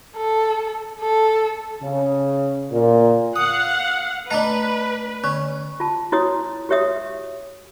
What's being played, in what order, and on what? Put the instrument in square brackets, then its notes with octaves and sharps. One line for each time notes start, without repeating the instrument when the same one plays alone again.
[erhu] A4
A4
[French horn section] C#3
A#2
[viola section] F5 F#5 [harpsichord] D#6
[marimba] A3 D#5 [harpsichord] D4 A5 A#5 [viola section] B4
[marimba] D3 [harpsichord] C#4
[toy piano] F4 A5
E4 F#4 C#5 D#6
F#4 G4 C#5 E5 D#6